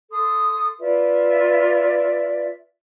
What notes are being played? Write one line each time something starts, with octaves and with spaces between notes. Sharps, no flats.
A4 C6 D#6
F4 B4 D5 E5